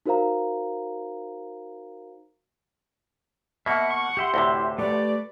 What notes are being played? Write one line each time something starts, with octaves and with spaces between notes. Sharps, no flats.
D#4 F#4 A#4 C5 F5 A#5
B2 A#3 E5 F#5
C#6
G4 E5 C6
D2 A2 C3 E4
A3 G4 B4 D5